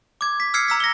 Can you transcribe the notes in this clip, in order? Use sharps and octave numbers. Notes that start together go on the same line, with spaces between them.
D6 G#6
B6
E6 F6 G#6 C7 C#7
A#5 E6 B6
A#6 G7